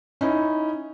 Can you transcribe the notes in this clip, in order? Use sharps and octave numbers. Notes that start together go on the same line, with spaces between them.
C#4 D#4 E4